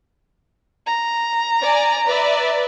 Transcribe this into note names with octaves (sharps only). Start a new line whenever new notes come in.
A#5
D5 G#5
B4 D5 E5